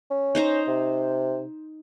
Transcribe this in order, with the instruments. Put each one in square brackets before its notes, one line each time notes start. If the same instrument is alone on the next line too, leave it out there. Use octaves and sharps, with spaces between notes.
[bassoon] C#4
[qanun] D#4 C5 A#5
[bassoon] C3